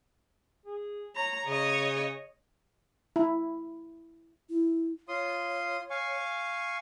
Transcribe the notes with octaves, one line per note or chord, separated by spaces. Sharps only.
G#4
C#5 A#5
C#3 C#5 D#5
E4
E4
F4 C#5 C6 D#6
F5 G#5 C#6